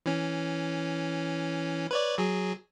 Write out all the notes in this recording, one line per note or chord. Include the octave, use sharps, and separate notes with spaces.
E3 C#4
B4 C#5 D5
F#3 G#4